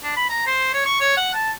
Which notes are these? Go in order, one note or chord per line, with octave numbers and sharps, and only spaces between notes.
D4
B5
A#5
C5
C#5
C#6
C#5
F#5
A5